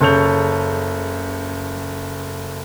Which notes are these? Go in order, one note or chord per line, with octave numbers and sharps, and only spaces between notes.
F#1 C#3 A4 C#5 G6 F7